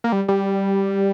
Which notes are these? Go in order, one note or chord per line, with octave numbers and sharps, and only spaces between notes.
A#3
G3
G3